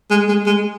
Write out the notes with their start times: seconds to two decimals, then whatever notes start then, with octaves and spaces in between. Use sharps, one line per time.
0.11 G#3
0.28 G#3
0.47 G#3